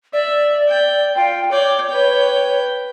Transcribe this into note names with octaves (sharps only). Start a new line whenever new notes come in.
D5 E5
G5
F4 G5
C#5 D5 G5
B4 G5